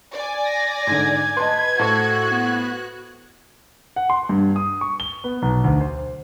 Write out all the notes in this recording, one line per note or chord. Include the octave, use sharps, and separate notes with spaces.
D5 G#5
A#6
G#2 D3 G#6
B4 D#5 A5 C6
A2 F#4 A4 C5 C#6 F#6
B3
F#5
C6
G2
D#6
C#6
G7
B3
B1
D2
C5